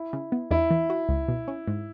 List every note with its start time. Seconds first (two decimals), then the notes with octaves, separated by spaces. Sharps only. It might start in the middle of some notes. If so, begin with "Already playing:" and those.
Already playing: E4
0.13 C#3
0.32 B3
0.51 E2 E4
0.71 E3
0.90 F#4
1.09 C#2
1.28 B2
1.48 C#4
1.67 G#2